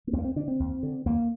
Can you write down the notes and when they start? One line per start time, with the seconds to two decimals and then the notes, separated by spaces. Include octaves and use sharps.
0.07 A#3
0.13 D#2 C4
0.19 A#3
0.24 C4
0.36 D3 D4
0.48 C4
0.60 D#2
0.83 D3
1.06 D#2 A#3